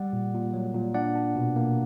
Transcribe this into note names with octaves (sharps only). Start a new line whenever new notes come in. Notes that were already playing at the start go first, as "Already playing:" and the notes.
Already playing: G3 D5 F#5
A#2
A#2
F#3
A#2
D4 D5 F#5
D4
B2
A#3